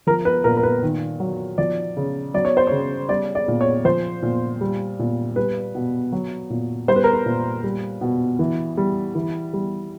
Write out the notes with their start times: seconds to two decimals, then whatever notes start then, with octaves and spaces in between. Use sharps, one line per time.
0.07 F3 A#4
0.25 B4
0.44 A#2 A#4
0.57 A#4
0.63 B4
0.83 D#3
1.20 F#3
1.58 F3 D5
1.97 C#3
2.34 F#3 D5
2.45 C#5
2.57 C5
2.67 C#3 C#5
3.09 G3 D5
3.35 D5
3.48 A#2
3.61 C#5
3.85 F3 C5
4.23 A#2
4.61 G3
4.99 A#2
5.36 G3 B4
5.75 B2
6.12 F#3
6.50 A#2
6.88 G3 C5
6.96 B4
7.04 A#4
7.13 B4
7.26 A#2
7.64 G3
8.01 B2
8.39 E3
8.77 G3
9.15 E3
9.53 G3